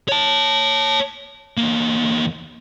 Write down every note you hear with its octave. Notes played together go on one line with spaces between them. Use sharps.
C#5 A5
E2 A#3